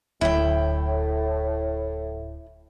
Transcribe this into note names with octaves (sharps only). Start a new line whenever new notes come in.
D1 A2 E4 E5 G5